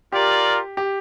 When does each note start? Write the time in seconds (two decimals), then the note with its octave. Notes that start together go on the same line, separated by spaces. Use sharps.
0.12 F4 G4 A#4 D5
0.77 G4